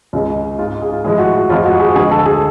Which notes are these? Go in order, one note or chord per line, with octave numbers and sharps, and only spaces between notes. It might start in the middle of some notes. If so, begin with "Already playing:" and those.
C#2 C#3 G#3
G#2 G#3 F4
G#4
F4
A2 F3 G#3 G#4
F#4
F#4
F2 F3 G#3 F4
F#4
G#4
D2 D3 F3 G#3 G#4
A4
G#4